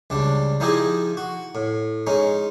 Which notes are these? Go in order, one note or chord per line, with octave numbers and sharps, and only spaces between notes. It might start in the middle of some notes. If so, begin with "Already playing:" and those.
C#2 G3 D4
F3 D#4 E4 G4 G#4 D#5
F#4
A2
G#3 C#4 D#4